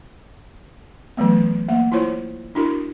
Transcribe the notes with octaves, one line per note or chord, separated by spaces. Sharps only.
E3 F#3 A3 B3
A#3 F#5
E4 F4 C5 C#5
D4 E4 F#4 A#4